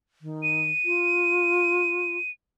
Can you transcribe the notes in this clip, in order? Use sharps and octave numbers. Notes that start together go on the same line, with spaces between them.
D#3
D#7
F4